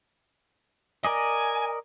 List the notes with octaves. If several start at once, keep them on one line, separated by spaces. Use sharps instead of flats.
A#4 D5 D#5 G#5